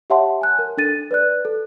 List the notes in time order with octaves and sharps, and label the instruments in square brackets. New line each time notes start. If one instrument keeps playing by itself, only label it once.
[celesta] G4 C#5 E5 F#5 A5 C6
G#5 F#6
A#4
D4 A4 A6 D#7
B4 D5 F#6
A4